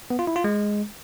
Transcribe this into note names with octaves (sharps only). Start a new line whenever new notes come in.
B3
F4
E4
F4
G#3